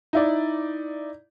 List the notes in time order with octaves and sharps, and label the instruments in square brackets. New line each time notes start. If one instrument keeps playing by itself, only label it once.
[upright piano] D#4 E4 D5